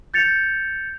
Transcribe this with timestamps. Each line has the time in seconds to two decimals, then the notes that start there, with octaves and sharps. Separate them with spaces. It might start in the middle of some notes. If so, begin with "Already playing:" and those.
0.14 G6 A6 C#7 F7